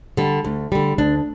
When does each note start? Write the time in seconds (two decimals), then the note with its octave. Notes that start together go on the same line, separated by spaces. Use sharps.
0.17 D3 G3
0.44 D2
0.72 D3 G3
0.98 D2 D4